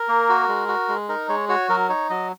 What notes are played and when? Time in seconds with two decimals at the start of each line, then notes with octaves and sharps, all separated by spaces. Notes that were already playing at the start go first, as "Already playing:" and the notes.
Already playing: A#4
0.08 A#3
0.29 F#4
0.48 G#3
0.68 F#4
0.88 G#3
1.09 D#4 A#4
1.29 G#3 C#5
1.49 F#4 C#5
1.69 F#3 A#4
1.89 D#4 C#5
2.10 F#3 D#5